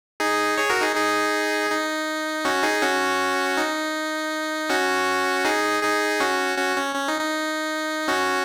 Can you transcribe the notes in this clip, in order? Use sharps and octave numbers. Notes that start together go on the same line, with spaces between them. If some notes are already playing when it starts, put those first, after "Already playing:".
D#4 G#4
G#4 C#5
F#4 A#4
D#4 G#4
D#4 G#4
D#4
C#4 F#4
D#4 G#4
C#4 F#4
D#4
C#4 F#4
D#4 G#4
D#4 G#4
C#4 F#4
C#4 F#4
C#4
C#4
D#4
D#4
C#4 F#4